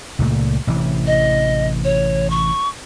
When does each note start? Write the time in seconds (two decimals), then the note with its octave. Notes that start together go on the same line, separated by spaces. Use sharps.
0.19 C#2 A#2 A3
0.67 A1 C3 E3
1.07 D#5
1.84 C#5
2.30 C#6